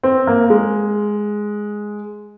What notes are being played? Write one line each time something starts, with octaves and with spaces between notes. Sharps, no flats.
C4
A#3
G#3